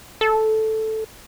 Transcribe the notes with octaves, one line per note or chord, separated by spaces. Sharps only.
A4